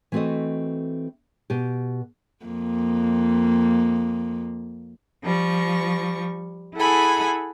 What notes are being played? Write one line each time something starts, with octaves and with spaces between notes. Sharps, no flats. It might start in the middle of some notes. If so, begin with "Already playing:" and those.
E3 A3 C4 F#4 A4 D#5
B2 G4
F2 A#3
F3 G3 C#6
E4 G#4 A4 F#5 G#5 B5